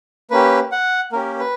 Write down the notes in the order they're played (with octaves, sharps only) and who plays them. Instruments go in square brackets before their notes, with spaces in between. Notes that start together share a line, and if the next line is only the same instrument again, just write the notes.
[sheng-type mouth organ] A#3 C#4 G4 B4
F#5
A#3 C#4 G4 A#4
B4